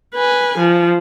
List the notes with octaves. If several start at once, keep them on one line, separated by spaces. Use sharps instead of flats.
B4 G#5
F3